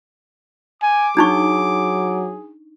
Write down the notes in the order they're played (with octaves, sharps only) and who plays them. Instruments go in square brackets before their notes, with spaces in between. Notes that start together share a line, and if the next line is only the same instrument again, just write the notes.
[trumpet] G#5 [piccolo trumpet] D6
[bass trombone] F#3 [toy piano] D4 D#4 C#6 [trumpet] G#4